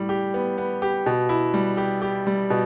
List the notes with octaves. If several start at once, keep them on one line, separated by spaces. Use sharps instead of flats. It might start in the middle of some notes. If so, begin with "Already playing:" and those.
Already playing: A2 G3
G4
B3
B3
G4
B2
E4
G3
G4
G4
G3
B2